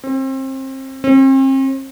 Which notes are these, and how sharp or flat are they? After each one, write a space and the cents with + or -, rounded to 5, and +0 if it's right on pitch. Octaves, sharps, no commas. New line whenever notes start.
C4 +30
C4 +40